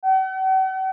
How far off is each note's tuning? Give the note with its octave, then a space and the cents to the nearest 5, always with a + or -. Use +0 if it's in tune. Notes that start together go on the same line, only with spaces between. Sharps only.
F#5 +45